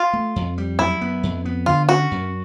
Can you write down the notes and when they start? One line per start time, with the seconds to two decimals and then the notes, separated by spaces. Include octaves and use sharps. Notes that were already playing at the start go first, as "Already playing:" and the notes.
Already playing: F4
0.13 A3
0.36 F2
0.58 G3
0.79 F#2 E4
1.01 B3
1.23 F2
1.45 B3
1.66 D3 F4
1.89 C#4 F#4
2.11 F#2